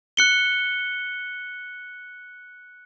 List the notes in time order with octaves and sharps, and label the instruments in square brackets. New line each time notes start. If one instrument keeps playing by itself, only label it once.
[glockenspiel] F#6 C#7 G7